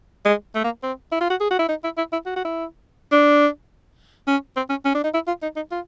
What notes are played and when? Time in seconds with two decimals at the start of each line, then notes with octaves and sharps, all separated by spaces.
0.25 G#3
0.55 A3
0.64 A#3
0.83 C4
1.12 E4
1.21 F4
1.30 F#4
1.41 G#4
1.50 F#4
1.59 E4
1.69 D#4
1.84 E4
1.97 E4
2.13 E4
2.26 F#4
2.36 F#4
2.45 E4
3.12 D4
4.28 C#4
4.57 C4
4.70 C#4
4.85 C#4
4.95 D4
5.04 D#4
5.14 E4
5.27 F4
5.42 D#4
5.56 D#4
5.71 F4